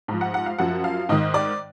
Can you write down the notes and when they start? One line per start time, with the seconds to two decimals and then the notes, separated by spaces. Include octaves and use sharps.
0.08 G#2 F3
0.21 F#5
0.34 F#5
0.46 F5
0.58 F#2 F3 F#5
0.84 F5
1.09 G#2 D#3 D#5
1.34 D5